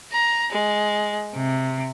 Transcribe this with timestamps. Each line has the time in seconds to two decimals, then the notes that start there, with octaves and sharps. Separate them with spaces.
0.13 A#5
0.53 G#3
1.35 C3